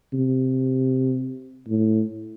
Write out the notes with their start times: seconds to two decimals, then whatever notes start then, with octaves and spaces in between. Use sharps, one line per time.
0.13 C3
1.69 A2